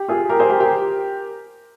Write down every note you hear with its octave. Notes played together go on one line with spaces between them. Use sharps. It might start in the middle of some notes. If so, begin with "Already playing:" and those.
Already playing: G4
F4 G#4
G4 A#4
G#4 C5
G4 A#4
G4 A#4